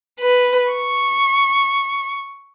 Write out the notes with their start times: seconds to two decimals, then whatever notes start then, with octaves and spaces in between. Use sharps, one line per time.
0.20 B4
0.72 C#6